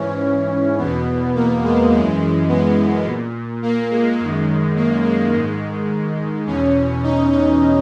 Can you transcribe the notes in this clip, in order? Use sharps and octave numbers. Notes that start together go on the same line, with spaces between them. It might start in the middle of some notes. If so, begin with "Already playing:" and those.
Already playing: G#2 E3 C#4
E2 B2 B3
A#3
G#3
F#2 E3 G#3
B3
A#2
A#3
G#3
F#2 D#3 G#3
A#3
G#3
G#2 D#3 G#3
E2 B2 C#4
D#4
D#4